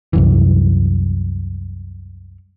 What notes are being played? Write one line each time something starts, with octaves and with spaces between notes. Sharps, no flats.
C2 F#2 E3